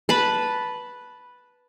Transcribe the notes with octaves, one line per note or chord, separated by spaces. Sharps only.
B4 A5 B5